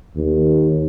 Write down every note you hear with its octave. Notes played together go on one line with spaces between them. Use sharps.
D#2